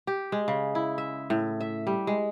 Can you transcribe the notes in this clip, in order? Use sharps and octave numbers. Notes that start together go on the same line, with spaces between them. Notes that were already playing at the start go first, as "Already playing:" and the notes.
G4
G#3
C#3
E4
E5
A2
E5
G3
G#3